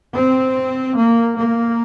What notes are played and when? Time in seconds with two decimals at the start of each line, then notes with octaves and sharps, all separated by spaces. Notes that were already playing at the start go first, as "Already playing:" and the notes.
0.15 C4
0.97 A#3
1.38 A#3